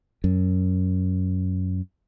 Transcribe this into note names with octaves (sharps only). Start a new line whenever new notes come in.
F#2